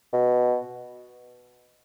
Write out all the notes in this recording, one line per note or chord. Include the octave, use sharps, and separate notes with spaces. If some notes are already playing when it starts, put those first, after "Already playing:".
B2